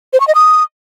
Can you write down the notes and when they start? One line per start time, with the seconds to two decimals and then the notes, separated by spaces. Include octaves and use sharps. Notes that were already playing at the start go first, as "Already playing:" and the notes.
0.13 C5
0.20 C#6
0.28 D#5
0.35 D#6